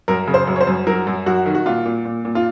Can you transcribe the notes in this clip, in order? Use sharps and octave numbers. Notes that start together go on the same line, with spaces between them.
F#2 A#4
C#3
C5
F#2
C#5
C5
F#2
F#3 A#4
F#2
F#2 F#4
D#3
F#4
A#2 F4
A#2
A#2
A#2
F4